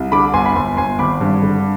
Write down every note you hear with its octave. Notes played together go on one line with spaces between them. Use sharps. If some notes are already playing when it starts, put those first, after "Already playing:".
Already playing: C2
D3 B5 D6
G1 G#5 C6
B5
G1 G#5 C6
G1 G#5 C6
G#1 B5 D6
G2
D3